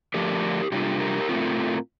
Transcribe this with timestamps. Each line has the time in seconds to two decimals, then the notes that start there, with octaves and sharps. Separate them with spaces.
0.14 D3 F3 A3 D4 G4 A#4
0.72 C3 G3 D4 F4 G4
1.00 G4 A#4
1.29 A2 A3 C4 F4